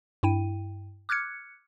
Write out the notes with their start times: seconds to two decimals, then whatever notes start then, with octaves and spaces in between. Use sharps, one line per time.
0.23 G2 E4 G5 D#7
1.09 D6 F6 F#6 G#6 C#7